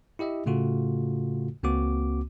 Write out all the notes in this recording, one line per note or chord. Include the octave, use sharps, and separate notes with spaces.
E4 G4 D#5 E5
A2 C#3 A3 F4 F#4 A4
C#2 A#3 C4 F#4 D6